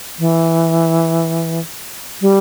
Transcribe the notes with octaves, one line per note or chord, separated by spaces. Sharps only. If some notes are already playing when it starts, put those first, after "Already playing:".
E3
G3